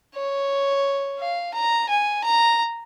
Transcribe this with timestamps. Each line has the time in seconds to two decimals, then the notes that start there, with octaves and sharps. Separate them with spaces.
0.15 C#5
1.19 F5
1.54 A#5
1.89 G#5
2.24 A#5